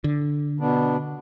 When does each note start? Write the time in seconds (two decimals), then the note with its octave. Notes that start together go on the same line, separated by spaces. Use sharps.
0.04 D3
0.60 B2 B3 D4